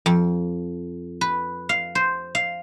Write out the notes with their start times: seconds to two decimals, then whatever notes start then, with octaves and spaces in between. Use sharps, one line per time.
0.06 F2
1.21 B4
1.69 F5
1.95 C5
2.35 F5